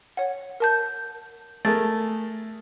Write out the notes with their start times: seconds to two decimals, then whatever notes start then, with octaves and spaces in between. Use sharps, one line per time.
0.17 C#5 F#5
0.60 A#4 A5 G6
1.65 A3 G#4 A#4 A6